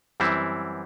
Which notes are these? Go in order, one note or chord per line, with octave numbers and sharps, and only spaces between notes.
F#2 E3 G3 C4 E4